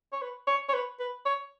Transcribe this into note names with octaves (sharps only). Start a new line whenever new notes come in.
C#5
B4
C#5
C#5
B4
B4
C#5